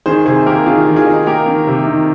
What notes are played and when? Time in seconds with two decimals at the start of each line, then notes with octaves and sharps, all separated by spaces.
0.06 D#3 G#4 C5
0.26 C3 G#4 C5
0.46 A#3 G4 A#4
0.66 D#3 F4 G#4
0.87 D#3
0.96 F4 G#4
1.07 D#4
1.26 A#3 G4 A#4
1.46 D#3
1.67 C3
1.87 D#3